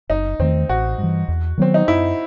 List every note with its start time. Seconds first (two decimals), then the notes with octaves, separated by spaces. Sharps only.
0.10 F#1 D#4
0.39 E2 D#3 A3 C4
0.69 A1 F#4
0.98 G2 E3
1.28 E2
1.58 D#3 F#3 B3 C4
1.74 D#4
1.88 F#2 E4